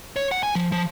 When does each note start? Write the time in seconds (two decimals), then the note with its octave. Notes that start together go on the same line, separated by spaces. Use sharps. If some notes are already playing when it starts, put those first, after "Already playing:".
0.16 C#5
0.32 F#5
0.43 G#5
0.55 F3
0.72 F3